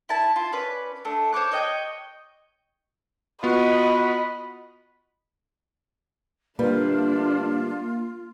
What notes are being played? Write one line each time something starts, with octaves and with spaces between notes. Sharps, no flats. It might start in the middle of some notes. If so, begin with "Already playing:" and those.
E4 A5
F4
C#4 B4 D5
A3 D4
C5 C#5 D6 F#6
C#5 D#5 G5 G6
B3 F4 F#4 D#5 B5
D3 G3 A3 A#3 D4 F4 B4